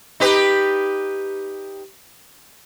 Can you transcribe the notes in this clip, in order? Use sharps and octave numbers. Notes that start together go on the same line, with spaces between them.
D#4 G4 B4